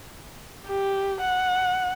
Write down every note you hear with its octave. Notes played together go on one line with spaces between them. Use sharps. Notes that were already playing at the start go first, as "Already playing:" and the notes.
G4
F#5